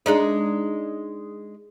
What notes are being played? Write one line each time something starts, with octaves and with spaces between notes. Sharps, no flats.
G#3 D4 D#4